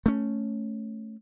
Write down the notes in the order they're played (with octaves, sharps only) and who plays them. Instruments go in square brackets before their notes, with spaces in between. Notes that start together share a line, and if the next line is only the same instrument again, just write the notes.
[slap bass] A3 C#4